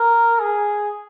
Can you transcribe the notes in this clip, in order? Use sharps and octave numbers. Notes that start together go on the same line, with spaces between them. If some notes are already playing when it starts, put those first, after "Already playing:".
Already playing: A#4
G#4